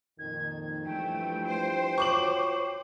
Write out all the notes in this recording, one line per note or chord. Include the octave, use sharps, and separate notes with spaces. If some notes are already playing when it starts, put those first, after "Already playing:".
F2 A#2 D#3 G#6
G2 E3 F3 A3 G5
C5
F4 F#4 C#5 C#6 D6 F#7